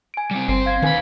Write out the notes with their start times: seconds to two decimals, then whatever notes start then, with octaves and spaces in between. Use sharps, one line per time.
0.14 G#5 D7
0.31 G3 C4
0.48 G1 C4 C5 C7
0.66 F5 G#6
0.82 D#2 D#3 B4 G#5 B5